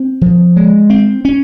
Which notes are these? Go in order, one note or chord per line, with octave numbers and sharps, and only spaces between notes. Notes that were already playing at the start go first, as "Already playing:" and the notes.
Already playing: C4
F3
G#3
C4
C#4